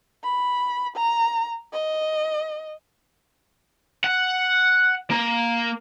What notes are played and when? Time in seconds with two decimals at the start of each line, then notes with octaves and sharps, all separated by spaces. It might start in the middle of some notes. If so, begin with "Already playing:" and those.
0.23 B5
0.96 A#5
1.73 D#5
4.04 F#5
5.11 A#3